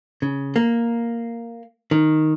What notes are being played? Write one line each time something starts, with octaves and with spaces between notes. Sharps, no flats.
C#3
A#3
D#3